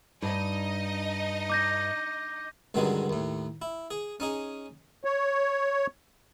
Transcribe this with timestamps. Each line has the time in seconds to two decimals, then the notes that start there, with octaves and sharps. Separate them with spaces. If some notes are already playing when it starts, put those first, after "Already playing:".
0.22 G2 D#4 D#5
1.50 D6 G6 A#6
2.74 C#2 G2 D3 D#3 F#3 G#3
3.09 D#2 A2
3.62 E4
3.91 G#4
4.20 C#4 D#4 G#4
5.05 C#5